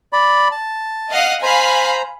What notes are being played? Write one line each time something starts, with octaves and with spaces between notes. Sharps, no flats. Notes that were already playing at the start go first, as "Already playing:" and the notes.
D5 B5
A5
D#5 F5 F#5
C5 F5 G#5 A#5 B5